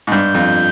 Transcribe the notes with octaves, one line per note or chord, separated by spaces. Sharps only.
G#2
G2 G6
F2